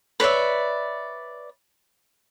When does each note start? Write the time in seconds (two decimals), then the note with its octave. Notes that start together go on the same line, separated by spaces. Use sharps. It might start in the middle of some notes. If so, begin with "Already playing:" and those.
0.20 B4 C#5 D5 E5